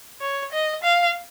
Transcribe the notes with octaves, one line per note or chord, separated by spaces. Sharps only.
C#5
D#5
F5